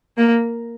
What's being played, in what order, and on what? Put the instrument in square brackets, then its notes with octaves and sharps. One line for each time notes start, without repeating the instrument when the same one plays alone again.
[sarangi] A#3